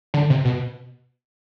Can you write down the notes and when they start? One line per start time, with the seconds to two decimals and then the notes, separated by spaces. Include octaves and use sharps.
0.14 D3
0.30 C3
0.45 B2